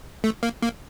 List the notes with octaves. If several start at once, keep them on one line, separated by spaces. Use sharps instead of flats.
A3
A#3
A#3